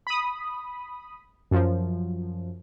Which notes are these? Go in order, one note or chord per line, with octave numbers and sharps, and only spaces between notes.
B5 D#6
F#2 F3